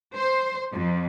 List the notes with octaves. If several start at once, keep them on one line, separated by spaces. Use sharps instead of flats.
C5
F2